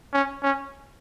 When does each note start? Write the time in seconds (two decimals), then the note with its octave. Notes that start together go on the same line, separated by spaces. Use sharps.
0.13 C#4
0.43 C#4